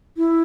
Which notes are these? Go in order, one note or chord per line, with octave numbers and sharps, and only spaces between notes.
E4